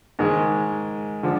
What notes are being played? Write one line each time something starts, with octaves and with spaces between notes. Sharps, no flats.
G#2 D#3 G#3
D3 F3